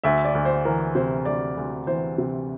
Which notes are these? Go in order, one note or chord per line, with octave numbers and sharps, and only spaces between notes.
D2 E5
D5
D2
C5
E3 A#4
C3 C5
D2 D5
D2
E3 C5
C3